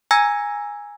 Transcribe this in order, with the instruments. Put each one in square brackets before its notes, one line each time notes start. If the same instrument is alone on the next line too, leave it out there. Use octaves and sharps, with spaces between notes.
[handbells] G#5 A#5 E6 G#6 A#6